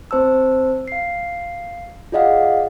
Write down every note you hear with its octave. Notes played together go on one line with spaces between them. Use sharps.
C4 C5 A5 E6
F5 C7
F4 G#4 D5 D#5 F5 F#5